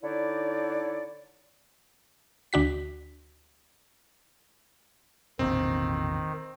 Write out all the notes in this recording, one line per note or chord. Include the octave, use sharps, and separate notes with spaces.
D3 D#4 E4 C#5 D5
D2 D4 F#4 B6
E1 A1 A#2 D#3 C4